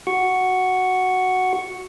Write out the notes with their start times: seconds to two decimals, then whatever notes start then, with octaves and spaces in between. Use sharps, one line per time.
0.07 F#4 C#6